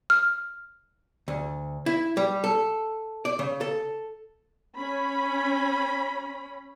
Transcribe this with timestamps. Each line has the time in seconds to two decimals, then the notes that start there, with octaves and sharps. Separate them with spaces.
0.10 F6
1.28 D2
1.86 E4
2.17 G3
2.44 A4
3.25 D5
3.39 C#3
3.61 A4
4.76 C#4 B5